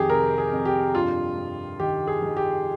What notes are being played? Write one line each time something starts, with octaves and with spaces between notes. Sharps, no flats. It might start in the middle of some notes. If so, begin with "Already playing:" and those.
Already playing: F2 D#3 G4 G#4
C3 A#4
G#4
F2
G4
G2 F4
G2
D#3 G4
G#4
D#3
G4